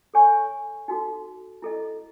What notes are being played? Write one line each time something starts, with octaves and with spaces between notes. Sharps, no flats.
A4 C#5 G#5 C#6
D#4 F#4 A4
E4 A4 D#5